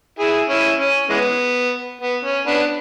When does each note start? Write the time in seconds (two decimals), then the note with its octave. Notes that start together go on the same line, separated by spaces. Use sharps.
0.19 E4 G#4
0.49 C#4 E4
0.80 C#4
1.10 E3 G#3 B3
2.01 B3
2.24 C#4
2.47 B3 D4